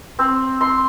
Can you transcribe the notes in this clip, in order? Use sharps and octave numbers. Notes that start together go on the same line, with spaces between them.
C4
C6